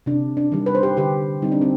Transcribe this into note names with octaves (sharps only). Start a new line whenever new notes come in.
C3 D4
D4
D#3 G3
B4
C5
G4 B4
D3 G4 B4
G3 C4 D#4
D4
C4